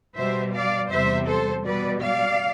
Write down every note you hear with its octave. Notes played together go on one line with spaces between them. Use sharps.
B2 G3 C5 E5
D5 F5
E2 C3 G3 C5 E5
A4 C5
B2 G3 B4 D5
D5 F5